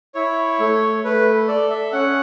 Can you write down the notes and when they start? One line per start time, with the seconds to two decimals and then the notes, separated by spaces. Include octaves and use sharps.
0.15 E4 C#5
0.60 A3
1.04 A3 B4
1.48 A4 D5
1.70 E5
1.93 C#4 F#5